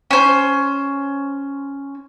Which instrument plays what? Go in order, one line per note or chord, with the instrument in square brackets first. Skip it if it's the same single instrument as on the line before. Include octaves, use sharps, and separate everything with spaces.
[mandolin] C#4 C5